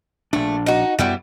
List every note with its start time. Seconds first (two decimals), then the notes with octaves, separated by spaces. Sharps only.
0.33 A#1 A3 D4
0.66 D#4 F#4
0.99 F#2 F#3 G3 B3 E4